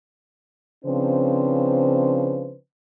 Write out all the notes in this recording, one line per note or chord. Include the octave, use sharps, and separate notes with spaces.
C#3 F3 C4 D4 B4 C5